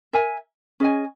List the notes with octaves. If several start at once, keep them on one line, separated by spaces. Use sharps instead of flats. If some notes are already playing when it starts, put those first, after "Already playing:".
A#4 E5 G#5
C#4 G#4 D#5 G#5